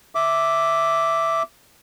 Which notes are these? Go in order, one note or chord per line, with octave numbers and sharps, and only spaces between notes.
E5 D6